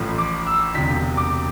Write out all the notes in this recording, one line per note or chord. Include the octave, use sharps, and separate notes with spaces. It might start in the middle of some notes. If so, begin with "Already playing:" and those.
Already playing: A1 A2 F3
D6
E6
E1 D2 C3 B6
D6